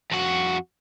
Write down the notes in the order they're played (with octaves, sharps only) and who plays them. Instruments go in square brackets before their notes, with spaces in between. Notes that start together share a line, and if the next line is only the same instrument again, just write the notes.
[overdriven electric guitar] F2 F#4